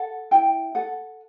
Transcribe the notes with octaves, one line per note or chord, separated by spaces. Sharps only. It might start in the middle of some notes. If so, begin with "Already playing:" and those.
Already playing: A4 F#5
E4 G5
A4 F#5